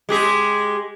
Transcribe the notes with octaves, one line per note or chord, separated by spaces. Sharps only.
G#3 G4 G#4